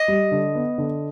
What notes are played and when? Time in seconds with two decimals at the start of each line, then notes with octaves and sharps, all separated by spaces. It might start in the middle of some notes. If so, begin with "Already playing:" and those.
Already playing: D#5
0.08 G3
0.32 D3
0.55 B3
0.78 D3